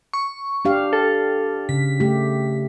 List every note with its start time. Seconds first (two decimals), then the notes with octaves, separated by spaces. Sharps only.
0.13 C#6
0.65 D4 G4 F5
0.93 A4
1.69 C#3 B6
2.00 A3 G4